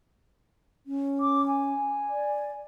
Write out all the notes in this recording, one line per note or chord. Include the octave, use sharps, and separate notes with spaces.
C#4
D6
G#5
D5